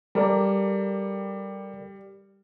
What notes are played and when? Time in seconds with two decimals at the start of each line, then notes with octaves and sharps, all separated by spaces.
0.15 G3 A4 A#4 D5